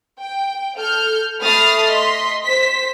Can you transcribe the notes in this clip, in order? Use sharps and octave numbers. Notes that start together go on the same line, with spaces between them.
G5
A4 F6 G6
A3 B5 D#6 F6 A6 C7
D#5 C6 B6
C5 B6